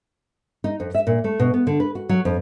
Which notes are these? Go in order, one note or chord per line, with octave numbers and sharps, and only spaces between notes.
D#4
F2
E5
A#2
A3
B2
B3
D3
B4
F#4
F#3
F2